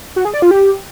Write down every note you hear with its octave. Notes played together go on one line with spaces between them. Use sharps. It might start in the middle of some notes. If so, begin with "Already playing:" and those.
F#4
G#4
D5
F4
G4